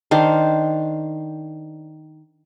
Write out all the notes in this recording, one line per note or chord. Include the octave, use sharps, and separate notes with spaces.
D#3 D4 C5 F5